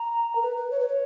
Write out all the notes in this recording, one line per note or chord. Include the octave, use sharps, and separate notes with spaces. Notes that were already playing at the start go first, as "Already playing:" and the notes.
Already playing: A#5
A#4
B4
B4
C#5
B4
C#5